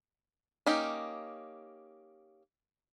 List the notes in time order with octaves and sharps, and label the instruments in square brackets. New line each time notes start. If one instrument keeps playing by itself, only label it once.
[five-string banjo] A#3 C#4 D#4 G4